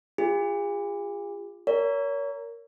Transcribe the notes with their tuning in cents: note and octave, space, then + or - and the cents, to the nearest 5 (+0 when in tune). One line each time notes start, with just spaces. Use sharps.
F4 +0 G#4 -40
A#4 -5 C#5 +30